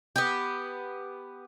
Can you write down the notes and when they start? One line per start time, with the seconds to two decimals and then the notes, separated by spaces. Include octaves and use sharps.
0.16 B3 G4